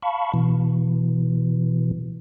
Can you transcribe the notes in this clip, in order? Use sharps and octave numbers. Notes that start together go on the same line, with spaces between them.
F5 A5 B5 C#6
B2 E3